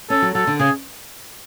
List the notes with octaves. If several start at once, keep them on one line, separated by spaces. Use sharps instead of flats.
C#4 A4
F#3
F#3 A4
D3
C#3 G#4